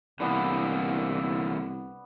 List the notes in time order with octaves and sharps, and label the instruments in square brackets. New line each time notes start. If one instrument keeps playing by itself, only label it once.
[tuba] C2 [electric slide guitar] D3 E3 A#3 [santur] B3 D4 B4